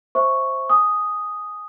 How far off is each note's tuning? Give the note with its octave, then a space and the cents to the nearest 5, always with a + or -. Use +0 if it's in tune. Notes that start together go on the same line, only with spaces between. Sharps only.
C5 +10 E5 +0 C#6 +0
G#5 +0 D#6 +0